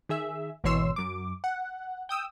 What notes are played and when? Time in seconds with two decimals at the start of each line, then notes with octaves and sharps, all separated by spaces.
0.09 D#3 G#4 E5
0.64 G#1 B2 E3 C#5 C6 E6
0.96 F#2 D6
1.44 F#5
2.09 G5 D#6 E6